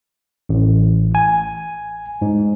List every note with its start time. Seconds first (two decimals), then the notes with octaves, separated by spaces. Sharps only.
0.49 A1
1.15 G#5
2.22 G#2